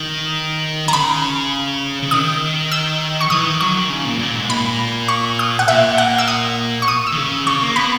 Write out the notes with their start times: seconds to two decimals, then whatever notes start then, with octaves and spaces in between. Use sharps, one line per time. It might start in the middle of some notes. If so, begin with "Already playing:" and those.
Already playing: D#3
0.88 D#3 A#5
0.93 C#3 B5
2.02 C#3
2.11 D#3 D#6
2.71 E6
3.21 C#6
3.30 E3 D#6
3.46 D#3
3.61 F#3 C#6
3.75 D#3
3.90 C#3
4.05 A#2
4.19 A#2
4.35 G#2
4.49 A#2 B5
5.08 C#6
5.39 D#6
5.59 F#5
5.68 A#2 E5
5.98 F#5
6.18 E6
6.28 D#6
6.82 C#6
6.88 D#6
7.07 E6
7.12 D#3
7.17 C#3
7.47 C#3 C#6
7.61 A#3
7.76 B3 B5